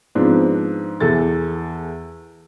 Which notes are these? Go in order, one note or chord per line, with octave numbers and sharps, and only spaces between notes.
G#2 F3 B3 C4 D4
E2 E3 A4 A6